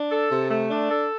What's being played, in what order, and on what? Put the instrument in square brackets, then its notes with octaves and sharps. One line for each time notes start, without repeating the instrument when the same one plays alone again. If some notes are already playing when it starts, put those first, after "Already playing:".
Already playing: [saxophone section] D4
A4
C3
A3
D4
A4